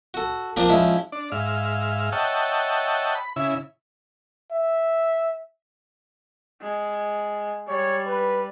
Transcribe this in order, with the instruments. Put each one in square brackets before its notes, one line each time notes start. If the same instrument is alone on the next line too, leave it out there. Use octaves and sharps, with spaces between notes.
[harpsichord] F#4 A4
F3 A#3 C4 D4 D5 A5
F3 G#3 C#4 E4
[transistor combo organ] D4 D5
G#2 E5 F5 F6
C#5 D#5 E5 F#5 G5 A5
B5
C#3 E4 E5
[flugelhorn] E5
[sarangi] G#3
[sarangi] G3 [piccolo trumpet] C#5
[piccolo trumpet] B4